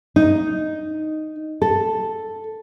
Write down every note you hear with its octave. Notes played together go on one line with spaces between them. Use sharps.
D#4
A4